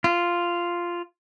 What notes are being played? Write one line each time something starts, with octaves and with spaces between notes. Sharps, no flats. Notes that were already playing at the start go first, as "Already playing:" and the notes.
F4